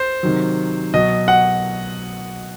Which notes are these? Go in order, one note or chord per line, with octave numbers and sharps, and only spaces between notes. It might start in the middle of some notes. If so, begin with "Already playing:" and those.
Already playing: C5
C3 D#3 F#3
B2 F#3 D#5
F#5